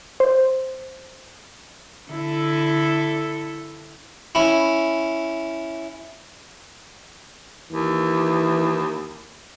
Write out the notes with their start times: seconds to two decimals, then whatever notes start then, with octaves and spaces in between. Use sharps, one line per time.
0.20 C5
2.11 D3 E4 A4
4.35 C#4 E4
7.71 D#2 E3